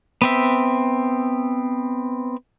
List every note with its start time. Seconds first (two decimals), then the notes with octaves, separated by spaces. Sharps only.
0.22 B3 C4 E5